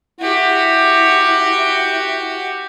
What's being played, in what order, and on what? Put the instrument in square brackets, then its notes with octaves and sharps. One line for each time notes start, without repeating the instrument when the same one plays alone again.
[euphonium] E4 [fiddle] F#4 G4